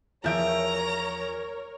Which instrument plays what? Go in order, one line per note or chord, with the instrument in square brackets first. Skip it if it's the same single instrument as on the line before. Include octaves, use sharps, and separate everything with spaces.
[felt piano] E2 G6 D7 [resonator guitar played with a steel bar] F3 E5 [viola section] A#4 C#5 [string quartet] A#5